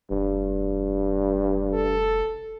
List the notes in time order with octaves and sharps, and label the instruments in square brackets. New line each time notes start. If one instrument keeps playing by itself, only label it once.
[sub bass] F1 [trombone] G2
[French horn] A4